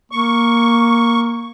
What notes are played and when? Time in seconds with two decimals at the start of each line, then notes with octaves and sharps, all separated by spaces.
0.12 A#3 C#6